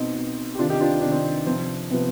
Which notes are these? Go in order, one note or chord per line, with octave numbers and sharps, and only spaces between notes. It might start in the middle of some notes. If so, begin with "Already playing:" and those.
Already playing: B2 C4 D#4
B2
G4
C3 D#3 D4 F4
D#4 G4
D4 F4
D#4
C3 D#3 D4
C4 D#4
C3 F3 C4
C3 F3 B3